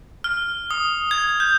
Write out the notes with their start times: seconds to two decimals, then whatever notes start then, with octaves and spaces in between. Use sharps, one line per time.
0.24 F6
0.71 D#6
1.11 G#6
1.40 G6